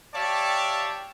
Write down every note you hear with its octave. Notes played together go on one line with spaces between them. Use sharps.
G4 C#5 D5 E5 F5 A5